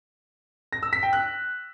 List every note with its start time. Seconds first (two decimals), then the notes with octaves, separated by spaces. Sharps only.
0.73 A#6
0.83 E6
0.93 B6
1.03 G5
1.13 F#6